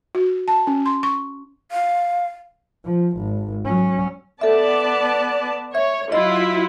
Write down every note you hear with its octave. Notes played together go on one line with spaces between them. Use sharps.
F#4
A5
C#4
C6
C#6
F5
F3
G#1
F#3 C#4
B3 A4 D5 E5 A5
C#5 E5
F#3 E4 F4 D#5